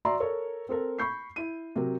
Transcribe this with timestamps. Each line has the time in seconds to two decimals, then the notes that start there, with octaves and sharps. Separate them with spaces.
0.05 F#4 D5 E5 A#5 C6 E6
0.20 A4 A#4 C#5
0.69 C4 A4 A#4
0.99 B5 C#6 G6 C7
1.36 E4 D#7
1.76 C3 F#3 A#4